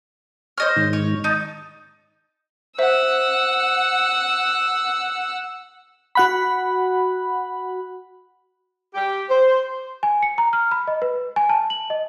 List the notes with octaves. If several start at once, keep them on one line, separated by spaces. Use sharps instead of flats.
C5 C#5 D#5 F6
G#2 D#3
C#5
D#4 A5 D#6
C5 E5 F#5 E6
F#4 F#5 B5
G4
C5
G#5
C#7
A#5
F6
B5
D#5
B4
G#5
A5
F#7
D#5